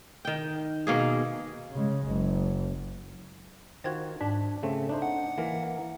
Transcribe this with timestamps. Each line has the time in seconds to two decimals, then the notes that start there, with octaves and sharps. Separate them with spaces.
0.25 D#3 G5
0.87 B2 A#3 G#4
1.72 C#3 G#3
2.06 F#1
3.84 D#3 F4 F#4 C5 G5 G#6
4.21 G#2 D4
4.63 C#3 A3 C4
4.89 D4 D#4 C5
5.02 F#5
5.38 E3 A#3 A#4